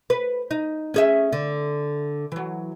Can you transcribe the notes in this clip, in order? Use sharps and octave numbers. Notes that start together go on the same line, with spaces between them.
B4
D#4
C#4 G#4 E5
D3
E3 F#3